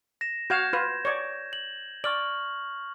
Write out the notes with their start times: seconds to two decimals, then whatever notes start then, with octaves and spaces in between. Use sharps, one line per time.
0.21 A#6 E7
0.50 F#4 F5 G6 G#6 E7
0.73 F4 B4
1.05 C#5 D5
1.53 F#7
2.04 D5 C#6 F6 F#7